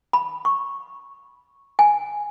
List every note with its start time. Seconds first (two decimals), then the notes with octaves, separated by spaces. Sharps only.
0.13 B5
0.45 C#6
1.79 G#5